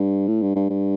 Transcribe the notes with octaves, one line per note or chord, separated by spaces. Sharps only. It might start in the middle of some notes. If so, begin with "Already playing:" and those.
Already playing: G2
A2
G2
G2
G2